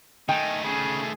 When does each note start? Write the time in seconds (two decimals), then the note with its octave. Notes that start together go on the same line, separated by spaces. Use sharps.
0.29 D#3 A3 D#4 G5 G#5
0.64 C#3 G#4